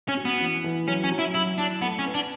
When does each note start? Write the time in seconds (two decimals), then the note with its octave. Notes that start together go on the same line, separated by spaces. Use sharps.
0.09 C#4
0.17 F#4
0.25 B3
0.40 E3
0.64 E3
0.88 F#3 C#4
1.04 C#4
1.12 F#3
1.19 E4
1.35 F#3 E4
1.59 D4 E4
1.82 A3 B3
1.99 C#4
2.06 B4
2.14 D4